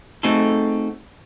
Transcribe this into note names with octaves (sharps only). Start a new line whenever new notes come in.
A3 C4 D#4 F#4 G#4 A4